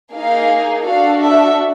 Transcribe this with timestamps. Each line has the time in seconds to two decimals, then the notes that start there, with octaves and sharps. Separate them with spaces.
0.12 A#3 D#4 G#4 F5
0.85 D4 F#4 A4 F5
1.22 E5